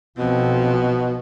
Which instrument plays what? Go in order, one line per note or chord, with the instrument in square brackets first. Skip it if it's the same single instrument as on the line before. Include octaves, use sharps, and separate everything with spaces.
[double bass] B1 F3 [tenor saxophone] B2 [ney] C4